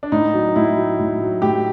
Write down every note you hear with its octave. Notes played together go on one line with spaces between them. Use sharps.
D4
A2 D#4
F#3
A2 E4
F#3
A2
F#3
A2 G4